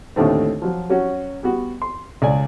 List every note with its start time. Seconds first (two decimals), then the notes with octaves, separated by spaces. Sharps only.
0.16 D#2 A2 D3 D#3 A3 C4
0.62 F3 F#3
0.90 F#3 C#4 F#4
1.43 G3 B3 F#4
1.82 C6
2.22 C#2 D5 G#5